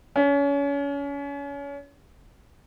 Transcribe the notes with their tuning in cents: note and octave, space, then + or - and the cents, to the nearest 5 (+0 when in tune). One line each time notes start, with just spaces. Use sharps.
C#4 +30